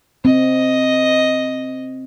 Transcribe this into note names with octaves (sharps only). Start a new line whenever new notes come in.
C4 D#5